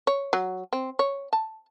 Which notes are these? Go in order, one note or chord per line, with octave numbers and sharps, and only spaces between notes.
C#5
F#3
C4
C#5
A5